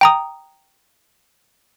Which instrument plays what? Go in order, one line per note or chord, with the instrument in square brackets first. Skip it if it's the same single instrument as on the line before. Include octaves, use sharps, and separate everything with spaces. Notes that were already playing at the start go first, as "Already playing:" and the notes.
[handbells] G5 A#5 D#6